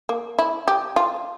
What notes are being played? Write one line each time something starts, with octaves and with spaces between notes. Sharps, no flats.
A#3
E4
G4
F4